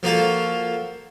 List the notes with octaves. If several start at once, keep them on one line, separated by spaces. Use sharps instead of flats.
F3 A#3 F#4 A4